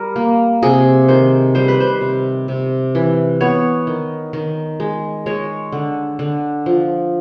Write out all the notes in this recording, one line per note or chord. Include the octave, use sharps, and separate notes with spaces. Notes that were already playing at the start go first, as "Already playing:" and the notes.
Already playing: G3 A#4
A#3
C3 G#4
D#3 C5
G3 C5
B4
C5
C3
C3
E3
B3 C#5
D#3
D#3
G#3
G#3 C#5
D3
D3
F3